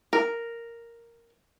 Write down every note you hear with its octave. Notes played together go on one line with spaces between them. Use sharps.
A#4